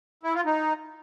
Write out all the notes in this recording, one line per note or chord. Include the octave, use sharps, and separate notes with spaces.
E4
F4
D#4